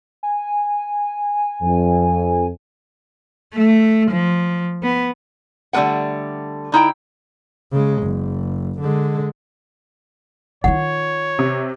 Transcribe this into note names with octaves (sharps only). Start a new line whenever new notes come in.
G#5
F2
A3
F3
B3
D3 G3 A3 B4 F#5
D3 D#4 E4 G5
C#3 G#3
F#1
D3 G#3
D#3 F4 C#5 F#5
C3